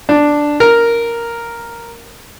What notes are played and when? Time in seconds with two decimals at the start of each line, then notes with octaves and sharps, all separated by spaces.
0.09 D4
0.60 A#4